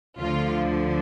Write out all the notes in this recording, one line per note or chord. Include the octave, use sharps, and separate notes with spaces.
D2 D3 F3 F4